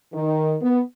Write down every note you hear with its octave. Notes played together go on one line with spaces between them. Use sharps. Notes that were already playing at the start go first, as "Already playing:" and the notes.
D#3
B3